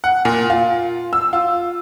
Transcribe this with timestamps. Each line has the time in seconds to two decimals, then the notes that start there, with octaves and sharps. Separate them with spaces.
0.04 F#5
0.25 A#2
0.50 F4
1.13 E6
1.33 F4